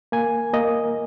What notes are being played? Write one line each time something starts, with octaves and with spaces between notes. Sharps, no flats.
A#3 G#5
A#3 D#5